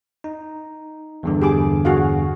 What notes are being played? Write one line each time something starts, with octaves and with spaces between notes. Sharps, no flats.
D#4
E2 G2 D3
G4 G#4 D6
F#4 G#4 F5